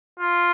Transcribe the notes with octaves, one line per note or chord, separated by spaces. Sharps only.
F4